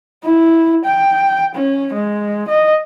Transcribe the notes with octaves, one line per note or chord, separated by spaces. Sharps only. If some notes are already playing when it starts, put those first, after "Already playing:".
E4
G5
C#4
G#3
D#5